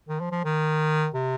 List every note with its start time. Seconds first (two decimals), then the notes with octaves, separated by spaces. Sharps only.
0.09 D#3
0.20 F3
0.32 F3
0.44 D#3
1.14 C3